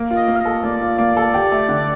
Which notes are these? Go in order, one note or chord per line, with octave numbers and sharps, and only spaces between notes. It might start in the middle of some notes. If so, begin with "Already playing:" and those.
Already playing: A#3
F4
D#5
A#3
F5
D#5
A4
A#3 D5
F4
A#3 D5
A4
G4
A3
D3